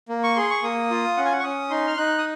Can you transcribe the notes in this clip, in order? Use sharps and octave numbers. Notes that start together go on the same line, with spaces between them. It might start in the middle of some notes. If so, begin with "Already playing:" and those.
A#3
C#6
G#4 C6
C#6
A#3 D#6
F4
C#4 F#5
G#5
F#5
C#6
C#4 D#6
D#4 C6
F6
D#4 F#6
D#6